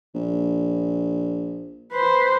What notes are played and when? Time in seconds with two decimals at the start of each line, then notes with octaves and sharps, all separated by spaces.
0.15 A#1
1.92 B4 C5